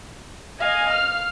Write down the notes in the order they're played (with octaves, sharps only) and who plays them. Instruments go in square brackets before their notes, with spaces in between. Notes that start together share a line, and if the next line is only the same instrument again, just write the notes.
[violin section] D#5 G#5 [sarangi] F5
[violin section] F6